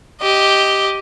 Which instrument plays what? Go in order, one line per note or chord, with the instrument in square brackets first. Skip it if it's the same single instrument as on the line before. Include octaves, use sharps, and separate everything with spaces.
[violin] G4 D#5